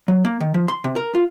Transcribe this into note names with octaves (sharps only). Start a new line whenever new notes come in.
F#3
A#3
D#3
F3
C6
C3
A#4
F4